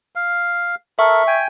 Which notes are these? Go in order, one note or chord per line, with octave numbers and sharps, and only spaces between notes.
F5
A4 A#4 E5 C#6
G5 G#5